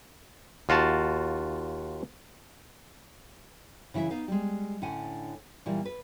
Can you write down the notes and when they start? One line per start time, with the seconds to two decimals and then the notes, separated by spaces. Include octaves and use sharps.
0.69 D#2 F4 F#4 A5
3.94 C#3 E3 E4 C5 E5
4.11 B3 D#4 F5
4.28 G3 G#3
4.82 A2 D3 C#4 F#5 G#5
5.66 A#2 E3 G3
5.85 B4